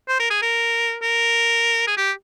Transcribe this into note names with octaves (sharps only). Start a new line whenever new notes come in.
C5
A#4
G#4
A#4
A#4
G#4
G4